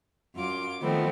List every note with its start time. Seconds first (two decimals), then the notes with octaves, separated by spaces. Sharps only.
0.34 F#2 F4 D6
0.81 D#3 F3 A3 B3 C4